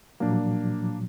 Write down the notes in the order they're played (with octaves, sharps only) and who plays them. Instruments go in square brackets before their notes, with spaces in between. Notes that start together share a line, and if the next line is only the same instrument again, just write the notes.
[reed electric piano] A#2 F3 F#3 [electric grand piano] A#3 D4